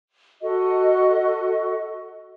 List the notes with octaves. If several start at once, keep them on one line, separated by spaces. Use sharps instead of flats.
F#4 A4 D#5